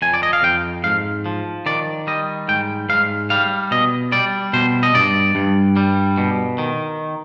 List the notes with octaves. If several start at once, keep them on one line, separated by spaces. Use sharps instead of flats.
F2 G#5
D5
D#5
F5
F2 G5
G#2 F5
F3
D#3 D5
G3 D#5
G#2 G5
G#2 F5
G3 F5
B2 D#5
G3 D5
B2 C5
D#5
G2 D5
G2
G3
B2
D#3